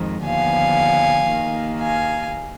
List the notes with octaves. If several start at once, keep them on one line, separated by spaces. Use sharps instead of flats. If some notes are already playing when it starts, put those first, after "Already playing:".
Already playing: F2 D#3 G#3
D#2 D3 F3 B3 F5 G#5
D#2 D#3 A#3
F5 G#5